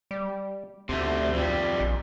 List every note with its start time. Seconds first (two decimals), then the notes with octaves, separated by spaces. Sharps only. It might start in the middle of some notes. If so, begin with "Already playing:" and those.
0.11 G3
0.89 D2 C3 A3
1.33 F2 G3
1.80 A#1